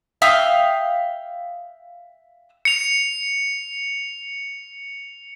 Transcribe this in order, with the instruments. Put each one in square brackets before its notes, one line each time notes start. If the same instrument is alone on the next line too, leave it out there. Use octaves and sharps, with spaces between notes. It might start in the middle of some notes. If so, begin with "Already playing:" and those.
[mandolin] E5 F5 G5 D#6
[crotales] C#7 F7